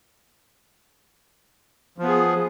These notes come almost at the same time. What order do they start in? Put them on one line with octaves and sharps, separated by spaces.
F3 B3 G#4